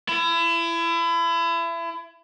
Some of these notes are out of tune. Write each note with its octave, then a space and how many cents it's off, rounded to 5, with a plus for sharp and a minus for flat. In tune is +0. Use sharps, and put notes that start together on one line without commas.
E4 +30